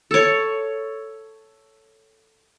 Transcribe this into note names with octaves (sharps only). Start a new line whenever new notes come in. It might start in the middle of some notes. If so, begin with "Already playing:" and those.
A4 C#5